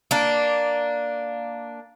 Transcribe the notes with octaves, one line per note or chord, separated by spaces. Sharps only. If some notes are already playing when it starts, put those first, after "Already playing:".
A#3 D4